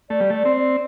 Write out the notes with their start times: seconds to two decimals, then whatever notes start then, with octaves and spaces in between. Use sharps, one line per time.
0.10 A3 D5
0.21 G3
0.30 A3 D5
0.45 C4
0.56 D5